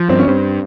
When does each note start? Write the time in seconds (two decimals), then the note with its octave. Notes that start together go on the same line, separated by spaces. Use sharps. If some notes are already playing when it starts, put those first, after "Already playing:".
Already playing: F3
0.09 G2 C4
0.19 C#4
0.27 G2 C4